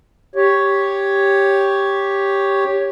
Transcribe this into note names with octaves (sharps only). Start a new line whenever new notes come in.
G4 C#5